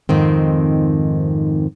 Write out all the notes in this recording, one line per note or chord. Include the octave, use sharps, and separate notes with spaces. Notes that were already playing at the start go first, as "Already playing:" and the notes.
F2 G#2 D#3 C4